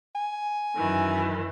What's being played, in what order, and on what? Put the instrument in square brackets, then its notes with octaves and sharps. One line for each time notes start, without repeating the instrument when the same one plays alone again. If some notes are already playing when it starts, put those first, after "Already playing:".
[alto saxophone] G#5
[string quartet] F#2 D#3 E3